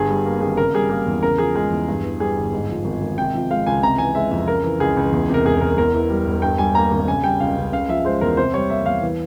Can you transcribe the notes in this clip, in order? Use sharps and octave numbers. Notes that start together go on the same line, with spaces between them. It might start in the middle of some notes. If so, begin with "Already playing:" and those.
Already playing: G1 G2 G#4
G3
A#3
G#1 G#4
C#3 A#4
G3 G#4
A#3 G#4
E2
C#3 A#4
F3 G#4
G#3 G#4
E2
G2
E3
G3 G#4
G1
G#2
F3
G#1
G#1
C3 G5
F3
G#3 F5
C#2 G#5
C3 A#5
E3 G#5
G#3 E5
F2 E5
C#3 A#4
E3
C#2 G#4
C#2
E2
C3 A#4
E1 G#4
E1 A#4
E2 A#4
E3
G3
E1
G2 G5
G3 G#5
A#3 A#5
G#1
C#3 G#5
G3 G5
C#2 F5
C#2
C#3 F5
F3 E5
G#3 C5
E2 A#4
C3 C5
G3 C#5
A#3 E5
E2 F5
E3